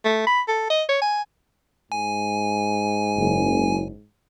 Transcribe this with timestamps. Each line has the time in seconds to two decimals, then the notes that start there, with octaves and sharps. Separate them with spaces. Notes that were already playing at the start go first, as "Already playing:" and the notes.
0.05 A3
0.27 B5
0.48 A4
0.71 D#5
0.89 C#5
1.02 G#5
1.92 G#2 G#5
3.16 F#1